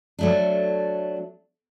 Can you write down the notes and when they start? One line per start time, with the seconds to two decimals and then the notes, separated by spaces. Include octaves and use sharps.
0.19 F#3 A3 D4